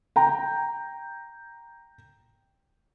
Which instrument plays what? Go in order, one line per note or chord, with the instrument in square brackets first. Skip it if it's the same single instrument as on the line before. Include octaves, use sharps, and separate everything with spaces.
[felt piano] G5 A#5